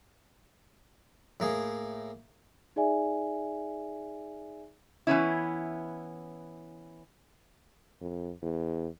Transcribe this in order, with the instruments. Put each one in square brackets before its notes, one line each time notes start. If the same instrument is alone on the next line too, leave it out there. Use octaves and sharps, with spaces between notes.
[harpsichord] A2 A#3 G#4
[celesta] D#4 G#4 D5 E5 G#5
[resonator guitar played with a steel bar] E3 B3 C#4 E4
[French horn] F2
E2